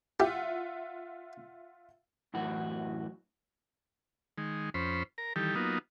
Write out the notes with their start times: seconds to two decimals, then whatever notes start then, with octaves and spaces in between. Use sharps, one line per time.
0.20 F4 G4 E5 F#5
2.34 F#2 A2 E3 F#4
4.38 D#3 G#3
4.74 F2 C#4 C5 B5
5.18 A#4 A#5
5.36 D#3 E3 G3 G4 A4
5.55 F#3 A#3 B3 D#4 F4